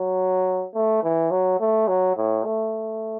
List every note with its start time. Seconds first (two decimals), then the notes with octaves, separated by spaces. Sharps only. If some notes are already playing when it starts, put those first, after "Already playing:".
Already playing: F#3
0.74 A3
1.03 E3
1.31 F#3
1.60 A3
1.88 F#3
2.16 A2
2.45 A3